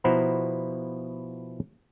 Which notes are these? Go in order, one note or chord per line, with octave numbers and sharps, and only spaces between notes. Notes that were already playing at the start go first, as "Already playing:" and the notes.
B2 F3 E4 C5 F#5 A#5